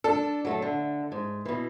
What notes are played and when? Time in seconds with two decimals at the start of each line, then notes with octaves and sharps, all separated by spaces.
0.04 D4 A4
0.45 F#3 A3
0.62 D3
1.12 G#2
1.45 B2 E3